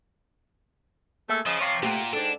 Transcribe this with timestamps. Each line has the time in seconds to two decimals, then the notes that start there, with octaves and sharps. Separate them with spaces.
1.29 A3 A#3 G#4 E5
1.46 C#3 F3 D#5
1.61 C3 C#5 F5 C6
1.83 A#2 A3 A#3 G4 F#5 G5
2.13 G#2 D4 A4 D5